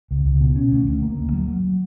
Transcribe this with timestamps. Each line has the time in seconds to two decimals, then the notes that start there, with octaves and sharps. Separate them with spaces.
0.11 C#2
0.25 C#2
0.41 B2
0.56 C#4
0.72 D2
0.87 D2
1.02 A#3
1.18 D2
1.32 F#3
1.48 F#3